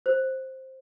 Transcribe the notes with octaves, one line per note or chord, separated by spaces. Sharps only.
C5